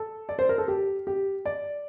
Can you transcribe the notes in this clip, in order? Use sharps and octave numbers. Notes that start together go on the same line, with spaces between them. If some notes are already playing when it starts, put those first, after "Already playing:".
Already playing: A4
D5
C5
A#4
A4
G4
G4
D5